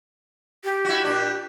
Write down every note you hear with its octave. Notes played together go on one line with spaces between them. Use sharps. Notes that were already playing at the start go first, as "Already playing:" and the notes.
G4
E4 F#4
A#2 D4